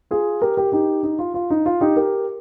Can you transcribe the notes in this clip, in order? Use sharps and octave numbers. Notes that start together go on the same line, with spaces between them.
F4 G#4
G4 A#4
G4 A#4
D#4 G4
D#4
F4
F4
D#4
F4
D#4 G4
G4 A#4